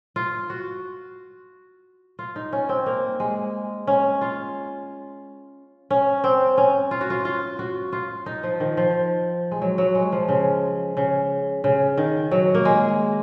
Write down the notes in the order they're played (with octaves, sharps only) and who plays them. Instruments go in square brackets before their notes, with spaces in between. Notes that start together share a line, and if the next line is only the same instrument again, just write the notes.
[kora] F4
F#4
F4
D#4
C#4
C4
A#3
G#3
C#4
F4
C#4
C4
C#4
F4
F#4
F4
F4
F#4
F4
D#4
F3
D#3
F3
G#3
F#3
F#3
G#3
F3
C#3
C#3
C#3
D#3
F#3
A#3
G#3